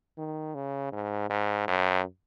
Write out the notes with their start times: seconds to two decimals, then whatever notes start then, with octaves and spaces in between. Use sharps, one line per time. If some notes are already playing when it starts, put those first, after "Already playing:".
0.18 D#3
0.55 C#3
0.92 G#2
1.30 G#2
1.68 F#2